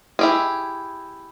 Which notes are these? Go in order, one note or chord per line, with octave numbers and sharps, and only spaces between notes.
E4 G4 G#4